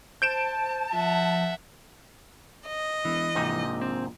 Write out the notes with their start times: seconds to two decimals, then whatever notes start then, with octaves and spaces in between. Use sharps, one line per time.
0.22 C5 A5 G6 D7 E7
0.92 F3 E5 F#5
2.66 D#5
3.05 E1 E3
3.35 A#1 G#2 C3 D#4
3.81 C4